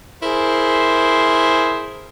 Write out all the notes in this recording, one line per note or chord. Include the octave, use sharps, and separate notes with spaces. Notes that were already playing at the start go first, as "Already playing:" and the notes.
E4 G#4 A#4 C5